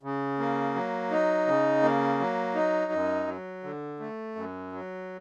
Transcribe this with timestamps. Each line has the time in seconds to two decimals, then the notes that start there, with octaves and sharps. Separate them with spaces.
0.03 C#3
0.39 A#3
0.75 F#3
1.11 D#4
1.47 C#3
1.83 A#3
2.19 F#3
2.55 D#4
2.92 F#2
3.27 F#3
3.64 D3
4.00 A3
4.35 F#2
4.72 F#3